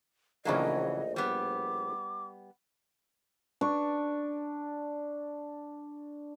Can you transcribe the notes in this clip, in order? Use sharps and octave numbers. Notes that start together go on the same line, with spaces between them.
A#1 A2 C#3 E3 F#3 A#3 D#5
G3 B3 D6
D4 C#6